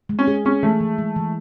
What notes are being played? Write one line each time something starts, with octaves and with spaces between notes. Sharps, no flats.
G#3
C#4
G#4
C#4 G#4
E3 A3
E3
G#3
E3